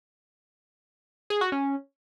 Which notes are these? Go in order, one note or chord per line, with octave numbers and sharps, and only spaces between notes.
G#4
F#4
C#4